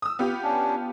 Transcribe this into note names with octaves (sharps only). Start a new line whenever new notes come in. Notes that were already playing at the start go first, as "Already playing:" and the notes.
D#6 E6
B3 F4 G4
C#4 D4